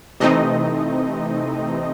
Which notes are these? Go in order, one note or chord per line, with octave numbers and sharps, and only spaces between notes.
C3 E3 A3 C4 D#4 D#5